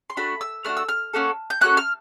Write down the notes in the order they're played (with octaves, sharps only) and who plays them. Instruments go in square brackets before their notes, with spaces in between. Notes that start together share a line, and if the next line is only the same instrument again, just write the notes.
[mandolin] C6
A3 D4 F#4 B5
E6
A3 D4 F#4 F6
E6
F6
A#3 C#4 F#4 A4
G6
A#3 C#4 F#4 A4 F#6
F6